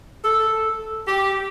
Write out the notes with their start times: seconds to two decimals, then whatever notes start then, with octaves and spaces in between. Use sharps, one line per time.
0.23 A4
1.07 G4